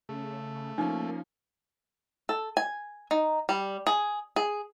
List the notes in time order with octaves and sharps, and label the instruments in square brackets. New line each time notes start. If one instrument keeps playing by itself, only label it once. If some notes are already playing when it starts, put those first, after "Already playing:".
[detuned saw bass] C#3 [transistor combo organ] A3
[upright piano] F3 C#4 [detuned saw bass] A#3 [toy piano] D#4
[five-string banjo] A4
G#5
D#4
G3
G#4
G#4